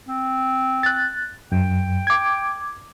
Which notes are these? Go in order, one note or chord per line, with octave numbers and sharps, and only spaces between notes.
C4
F#6 A6
F#2 G5
D6 G#6